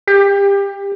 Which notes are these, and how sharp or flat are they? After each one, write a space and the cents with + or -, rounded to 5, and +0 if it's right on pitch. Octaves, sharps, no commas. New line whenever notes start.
G4 +30